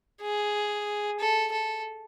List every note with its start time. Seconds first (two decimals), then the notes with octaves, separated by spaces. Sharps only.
0.22 G#4
1.20 A4
1.52 A4